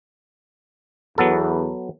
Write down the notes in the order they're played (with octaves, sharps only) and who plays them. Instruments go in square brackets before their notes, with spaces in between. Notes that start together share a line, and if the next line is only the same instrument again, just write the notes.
[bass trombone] E2 [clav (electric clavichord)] F#3 B3 A4